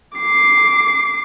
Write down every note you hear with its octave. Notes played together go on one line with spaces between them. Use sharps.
D6 C7